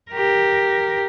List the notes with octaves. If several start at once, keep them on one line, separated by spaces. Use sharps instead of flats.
G4 A#4